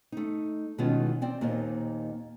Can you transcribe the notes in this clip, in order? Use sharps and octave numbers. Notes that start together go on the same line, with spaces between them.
A3 D#4
B2 D#3 E3 G#3 C#4 F4
C4 D5 G5
D#2 A#2 D#3 C4 D#5